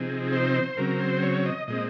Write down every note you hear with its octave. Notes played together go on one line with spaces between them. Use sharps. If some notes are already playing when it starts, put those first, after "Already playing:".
Already playing: C3 F3 C4 D#4 G#4
C5
C#3 F#3 C4 A#4
C5
C#5
D#5
A#2 G#3 C4 D#5